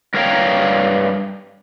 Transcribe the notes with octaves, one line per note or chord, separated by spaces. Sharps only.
G2 A#4 C#5 F5 G5 A#5